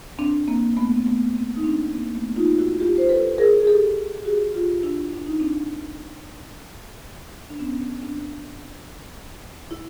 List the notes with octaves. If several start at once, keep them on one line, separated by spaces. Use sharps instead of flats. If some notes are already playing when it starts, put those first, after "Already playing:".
C4 D4
A#3 C4
A3 B3
C4
A3 B3
A#3 C4
D#4
C4 D4
A#3 C4
A3 B3
D#4 F4
E4 F#4
F4 G4
C5
A4 B4
G#4 A#4
G#4
G4 A4
G4
F#4 G#4
F4 G4
D4 E4
D4
D#4
C4 D4
D4
B3 C#4
C4 D4
E4